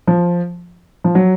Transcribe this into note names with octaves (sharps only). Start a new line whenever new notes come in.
F3
F3
F#3